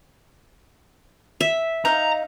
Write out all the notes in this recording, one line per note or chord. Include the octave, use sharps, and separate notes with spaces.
E5
D#4 F5 A#5